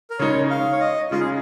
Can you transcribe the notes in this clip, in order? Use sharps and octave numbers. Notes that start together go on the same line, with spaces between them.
A#4
C#3 G#3 D#4 C#5
F5
C#5
D#5
C#3 G#3 D#4 F4
G#4